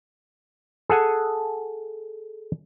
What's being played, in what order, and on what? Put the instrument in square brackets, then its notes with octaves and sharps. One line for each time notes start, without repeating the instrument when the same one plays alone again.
[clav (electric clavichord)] G#4 A4 F#5 G#5